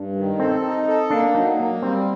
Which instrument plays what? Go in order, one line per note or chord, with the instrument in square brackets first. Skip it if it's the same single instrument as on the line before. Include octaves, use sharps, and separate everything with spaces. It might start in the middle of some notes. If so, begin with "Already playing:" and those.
Already playing: [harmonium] G2 [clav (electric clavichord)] D4
[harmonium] D#3
[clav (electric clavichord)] C4 [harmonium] A4
[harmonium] D#4
A4
[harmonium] A#3 [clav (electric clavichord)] D4
[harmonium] F#3 [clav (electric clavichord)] D#4
[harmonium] A#3
[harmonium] G3 [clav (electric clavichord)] C4